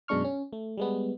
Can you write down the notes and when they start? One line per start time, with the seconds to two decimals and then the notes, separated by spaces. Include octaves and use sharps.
0.08 F#2 B2 G#3 D4 C#6 F6
0.24 C#4
0.53 A3
0.77 G3 G#3 B3